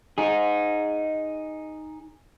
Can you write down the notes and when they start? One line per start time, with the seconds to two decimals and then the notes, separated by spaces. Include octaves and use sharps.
0.18 D#4 G#4